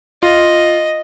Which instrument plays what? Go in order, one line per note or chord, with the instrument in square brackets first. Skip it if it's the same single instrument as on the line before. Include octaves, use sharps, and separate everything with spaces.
[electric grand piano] F4 [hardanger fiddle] D#5